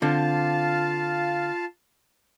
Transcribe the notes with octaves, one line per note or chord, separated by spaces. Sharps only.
D3 C4 F4 F5 A5